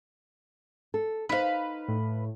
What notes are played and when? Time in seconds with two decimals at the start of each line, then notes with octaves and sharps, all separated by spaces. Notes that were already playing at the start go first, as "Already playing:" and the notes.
0.94 A4
1.29 D#4 B4 C5 F5
1.88 A2